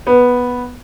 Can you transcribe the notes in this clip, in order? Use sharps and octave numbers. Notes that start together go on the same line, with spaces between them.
B3